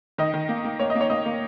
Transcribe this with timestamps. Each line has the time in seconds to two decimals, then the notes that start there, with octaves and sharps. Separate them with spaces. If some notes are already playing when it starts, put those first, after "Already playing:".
0.18 D#3 D#5
0.34 D#3
0.49 A#3
0.65 A#3
0.79 A#3 C#5
0.90 D#5
0.95 A#3
1.01 C#5
1.10 A#3 D#5
1.26 A#3